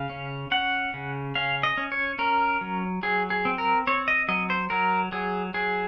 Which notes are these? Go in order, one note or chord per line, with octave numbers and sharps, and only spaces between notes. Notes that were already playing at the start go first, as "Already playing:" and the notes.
Already playing: C#3 F5
C#4
C#4 F#5
C#3
C#4 F5
D#5
C#4
C#5
C#4 A#4
F#3
F#3 G#4
G#4
C4
A#4
C4 C#5
D#5
F#3 D#5
C5
F#3 A#4
F#3 G#4
F#3 G#4